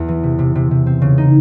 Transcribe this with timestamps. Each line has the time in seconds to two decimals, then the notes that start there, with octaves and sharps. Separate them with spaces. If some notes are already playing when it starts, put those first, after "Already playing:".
Already playing: E2
0.08 E3
0.24 C3
0.39 C3
0.55 C3
0.71 C3
0.86 C4
1.02 C#3
1.18 D#4